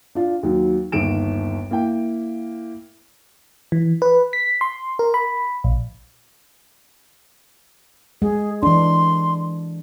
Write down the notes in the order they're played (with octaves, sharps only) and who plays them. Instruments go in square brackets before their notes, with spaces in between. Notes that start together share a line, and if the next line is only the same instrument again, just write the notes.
[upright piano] D4 F4
D#2 F#3
G1 D#2 D7 E7
A#3 E4 G5
[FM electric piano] E3
B4
B6
C6
A#4
B5
A#1
[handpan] G#3 [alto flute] G#4
[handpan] E3 D4 [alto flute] C6